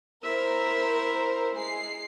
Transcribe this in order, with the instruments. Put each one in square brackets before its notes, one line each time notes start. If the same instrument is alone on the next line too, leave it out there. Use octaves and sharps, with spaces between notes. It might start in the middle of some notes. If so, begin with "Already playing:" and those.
[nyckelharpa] E4 E5 [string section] A#4 C5
[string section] G#3 C7